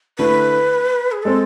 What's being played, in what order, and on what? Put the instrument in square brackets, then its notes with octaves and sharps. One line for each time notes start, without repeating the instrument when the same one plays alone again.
[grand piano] D3 A3 E4 [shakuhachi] B4
[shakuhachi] G#4
[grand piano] G#3 C4 [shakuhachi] A4